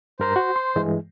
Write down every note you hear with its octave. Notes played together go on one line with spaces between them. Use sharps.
G2 A#4 C5 A#5
F#4
C6
G2 E3 G#3